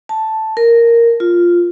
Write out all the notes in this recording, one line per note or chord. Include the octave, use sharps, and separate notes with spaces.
A5
A#4
F4